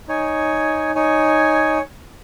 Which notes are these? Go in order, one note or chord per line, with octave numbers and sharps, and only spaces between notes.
D#4 C#5 G#5
D#4 C#5 G#5